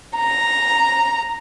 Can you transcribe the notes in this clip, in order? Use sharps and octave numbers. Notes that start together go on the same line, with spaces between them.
A#5